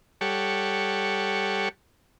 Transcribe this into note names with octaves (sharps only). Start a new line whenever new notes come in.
G3 G4 A4 C#5 F#5